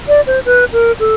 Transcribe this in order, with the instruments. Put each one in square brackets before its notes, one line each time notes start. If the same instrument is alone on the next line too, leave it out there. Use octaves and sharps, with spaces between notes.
[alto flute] D5
C5
B4
A#4
A4